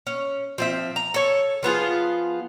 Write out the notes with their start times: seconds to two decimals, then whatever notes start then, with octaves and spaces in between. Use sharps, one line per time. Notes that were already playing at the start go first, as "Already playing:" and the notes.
0.07 C#4
0.58 F3 C4 E5
0.96 A#5
1.14 A4 C#5
1.63 F3 B3 F4 G#4